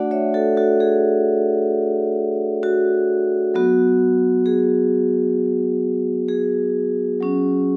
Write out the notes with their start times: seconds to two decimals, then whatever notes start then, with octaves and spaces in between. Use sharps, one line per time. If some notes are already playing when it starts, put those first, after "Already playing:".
Already playing: A3 D4 F#4 D5 F#5
0.11 C#5 E5
0.34 F#4 A4
0.57 F#4 A4
0.80 G#4
2.63 F#4
3.54 F#3 B3 F#4
4.46 G#4
6.28 G#4
7.21 F#3 C#4 F#4